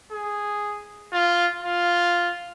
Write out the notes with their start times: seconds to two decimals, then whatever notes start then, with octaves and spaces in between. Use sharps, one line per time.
0.12 G#4
1.13 F4
1.62 F4